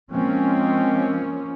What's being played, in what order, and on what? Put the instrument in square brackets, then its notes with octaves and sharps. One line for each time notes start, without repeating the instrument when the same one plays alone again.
[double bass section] F3 A#3 C#4 [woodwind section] G#3 C4